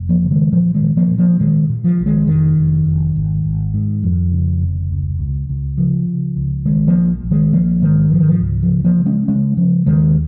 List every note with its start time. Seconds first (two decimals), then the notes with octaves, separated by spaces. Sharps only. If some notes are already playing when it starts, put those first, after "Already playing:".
Already playing: F1
0.09 F3 A#3
0.24 C#3
0.31 D#3 G#3
0.52 A#2 F3
0.74 D#3 G#3
0.82 A#2
0.97 F3 A#3
1.11 A#2
1.18 F3 A#3
1.40 A#2 D#3 G#3
1.69 A#2
1.84 F3
1.99 A#1
2.06 D#3 G#3
2.27 F1 D#3
2.57 F1
2.86 F1
3.16 G#1
3.45 G#1
3.74 G#2
4.03 F2
4.32 C#3
4.61 F1
4.91 C#2
5.19 C#2
5.49 C#2
5.77 C#3 F3
6.07 C#3
6.36 C#2
6.65 A#1 D#3 G#3
6.87 F3 A#3
6.95 A#1
7.24 A#1
7.31 D#3 G#3
7.53 A#1 F3 A#3
7.82 G#2 D#3 G#3
8.11 G#2 F3
8.20 D#3
8.28 F3
8.41 C#2
8.62 F3
8.69 C#3
8.84 F3 A#3
8.99 C#3
9.06 G#3 C#4
9.28 C#3 G#3 C#4
9.57 C#3 F3
9.86 D#2 D#3 G#3